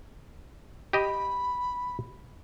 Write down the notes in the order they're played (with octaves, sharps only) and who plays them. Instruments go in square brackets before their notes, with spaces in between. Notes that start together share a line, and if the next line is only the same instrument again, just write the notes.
[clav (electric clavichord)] G4 D#5 [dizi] B5